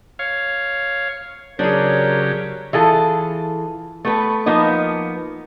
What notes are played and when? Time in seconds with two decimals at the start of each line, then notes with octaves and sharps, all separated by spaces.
0.19 C#5 F5
1.59 C#3 F#3 D4 G4 G#4 A#4 C#5
2.73 E3 F4 G#4 A4
4.05 A3 B3 B4
4.46 F3 A#3 B3 D#4